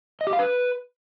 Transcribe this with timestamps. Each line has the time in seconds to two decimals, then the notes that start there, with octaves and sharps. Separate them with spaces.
0.21 D#5
0.27 G4
0.33 F5
0.39 B4